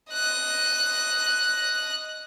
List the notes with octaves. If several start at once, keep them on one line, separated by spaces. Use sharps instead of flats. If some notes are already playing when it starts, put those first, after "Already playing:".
D#5 F#6